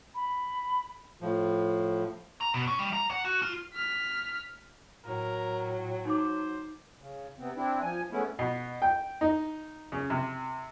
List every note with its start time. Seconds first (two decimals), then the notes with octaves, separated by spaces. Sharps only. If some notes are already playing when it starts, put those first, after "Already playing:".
0.15 B5
1.21 A2 F3
2.41 A#5
2.54 B2
2.67 C#4
2.79 G3
2.93 A#5
3.11 F#5
3.25 F#4
3.42 F4
3.74 F6 B6
5.06 A2 F#3 A#4
6.05 D#4 C5 C6 D6
7.00 C#3
7.38 C3 B3 C4
7.56 C4 D4 E4
7.83 F3 G#5
8.11 G#3 A3 B3 C#4 E4
8.39 B2
8.82 G5
9.21 D#4
9.92 C#3
10.10 C3